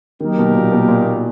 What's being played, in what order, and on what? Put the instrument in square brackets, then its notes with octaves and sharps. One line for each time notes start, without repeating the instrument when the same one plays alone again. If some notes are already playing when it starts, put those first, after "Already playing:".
[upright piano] D#3 [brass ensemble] F#3 A#3 D#4 G4 A#4
[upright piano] B2
A#2
B2
A#2